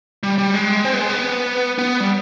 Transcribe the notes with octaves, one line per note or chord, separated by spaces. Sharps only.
G3
G3
G#3
C4
B3
G#3
B3
B3
G3